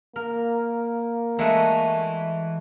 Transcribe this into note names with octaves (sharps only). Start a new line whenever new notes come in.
A#3 A#4
E3 G#3 A3 F#4 E5